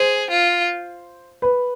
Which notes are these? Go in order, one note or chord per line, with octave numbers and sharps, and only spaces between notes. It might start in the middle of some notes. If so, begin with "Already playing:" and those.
Already playing: G#4 C5
F4
B4